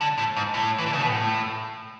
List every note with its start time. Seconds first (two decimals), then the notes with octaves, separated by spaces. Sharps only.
0.01 D3
0.18 A2
0.36 G#2
0.54 A2
0.78 E3
0.86 D3
0.93 C#3
1.01 B2
1.09 A2